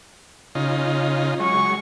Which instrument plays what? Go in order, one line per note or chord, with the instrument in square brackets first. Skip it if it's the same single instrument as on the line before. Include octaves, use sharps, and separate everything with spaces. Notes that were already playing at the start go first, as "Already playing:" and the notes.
[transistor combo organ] C#3 D#4 F4
[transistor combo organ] F#3 G#3 [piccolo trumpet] C#6